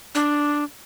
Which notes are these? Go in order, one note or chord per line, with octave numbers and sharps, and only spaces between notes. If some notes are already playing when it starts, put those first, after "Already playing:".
D4